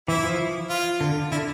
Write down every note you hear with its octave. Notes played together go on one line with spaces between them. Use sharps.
E3 E4
F3
F4
D3
D3 E4